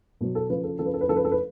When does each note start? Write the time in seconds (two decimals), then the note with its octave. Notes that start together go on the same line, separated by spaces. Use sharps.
0.21 B2 F#3
0.35 A4
0.50 C#3 F3 B4
0.64 A4
0.79 C#3 F3 A4
0.86 B4
0.94 A4
1.01 B4
1.08 C#3 F3 A4
1.16 B4
1.25 A4
1.32 B4